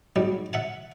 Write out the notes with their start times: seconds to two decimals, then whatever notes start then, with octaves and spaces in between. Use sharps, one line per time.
0.16 G#2 F#3 G3
0.53 E5 F#5 A5